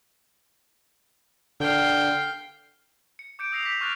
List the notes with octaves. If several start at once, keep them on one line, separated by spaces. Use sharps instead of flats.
D3 F5 G5
C#7
D6 G6 C#7 D7
D#6 E6 A#6 C7 C#7 F7
D6 B6 C7
C#6 F6 F#6 A6 F7